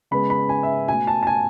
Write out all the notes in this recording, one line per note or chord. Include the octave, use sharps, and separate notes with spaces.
C#3 G#3 B3 B5
B5
G#5
E5
B2 A3 G#5
A5
A5
G#5